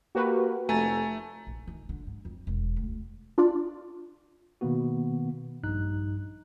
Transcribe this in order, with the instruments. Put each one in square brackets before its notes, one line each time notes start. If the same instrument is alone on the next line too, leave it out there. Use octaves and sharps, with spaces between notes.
[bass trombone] A#3 [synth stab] F#4 G4 B4
[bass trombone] F1 [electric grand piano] A3 [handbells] G#5 A#5 A6
[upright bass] A#1
D#3
D3
G#2
F2
E1
D2
[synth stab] D4 F4 D5
[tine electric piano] B2 D#3 A#3 B3 F#4
A#1 G2 D#4 F#6